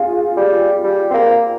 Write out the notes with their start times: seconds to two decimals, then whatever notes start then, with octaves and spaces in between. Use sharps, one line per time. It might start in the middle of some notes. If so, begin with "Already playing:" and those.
Already playing: F4 G#4
0.37 G3
0.84 G3
1.11 C4
1.14 A#3